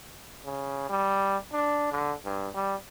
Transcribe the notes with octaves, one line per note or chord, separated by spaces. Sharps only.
C#3
G3
D4
D3
G2
G3